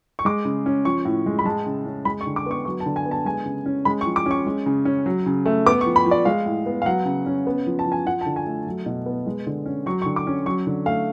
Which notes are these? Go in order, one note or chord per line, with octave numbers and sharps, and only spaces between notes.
C#6
G#3 D6
C#3
C#4
F3 C#6
A2
G#3
B5
G#3 A5
C#3
C#4
G#3 B5
C#6
D3
D6
B3 C#6
F#3 C#6
A5
D3
G#5
B3
A5
G#3 G#5
C#3
C#4
G#3 B5
C#6
F3
D6
C#4 C#6
G#3
C#3
C#4
F#3
C#3
A3
B3 D6
C#6
F3
B5
F3
D5
G#3 F5
A2
B3
F5
F#3 F#5
C#3
C#4
B3
F3
A5
F3
G#5
F3 F#5
A5
D3
G#5
A3
F#3
B2
B3
G#3
D3
C#4
F#3 C#6
C#6
D3
D6
C#4
F#3 C#6
D3
A3 F5